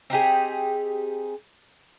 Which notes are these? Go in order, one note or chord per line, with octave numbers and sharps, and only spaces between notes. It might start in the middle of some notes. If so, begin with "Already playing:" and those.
C4 D#4 G4 G#4